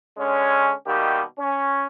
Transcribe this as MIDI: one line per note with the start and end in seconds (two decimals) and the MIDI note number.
0.17 0.71 50
0.17 0.71 56
0.17 0.71 61
0.86 1.20 47
0.86 1.20 51
0.86 1.20 55
0.86 1.20 58
0.86 1.20 67
1.39 1.85 61